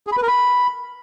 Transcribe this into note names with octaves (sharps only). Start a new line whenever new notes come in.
G#4
B5
B4
A#4
B5